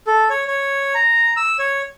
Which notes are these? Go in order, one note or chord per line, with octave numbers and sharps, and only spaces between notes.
A4
C#5
C#5
A#5
E6
C#5